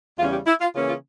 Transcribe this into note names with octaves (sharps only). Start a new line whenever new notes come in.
E2 C#3 G3 C#4 F4
G4
E4
F4
C#3 E3 A#3 C#4 F4
F4